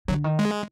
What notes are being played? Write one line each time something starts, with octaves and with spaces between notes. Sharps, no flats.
D3 F#3
D#3
G#3